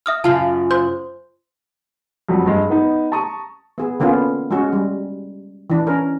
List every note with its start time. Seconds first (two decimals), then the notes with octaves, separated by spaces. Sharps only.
0.06 E5 D#6 F6
0.24 F#2 C#3 F4 A5 F6
0.71 C5 C6 G6
2.29 F2 F#3 G3
2.46 G2 G#3
2.70 B3 D#4
3.12 A5 A#5 C#6 D#6
3.78 B3 G#4
4.00 D3 A#3 B3 C#4 F4
4.51 G#3 C#4 F#4
4.73 G3
5.70 E3 D4
5.87 C#4 A#4